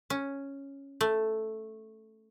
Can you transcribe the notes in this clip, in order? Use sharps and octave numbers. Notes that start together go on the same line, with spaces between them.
C#4
A3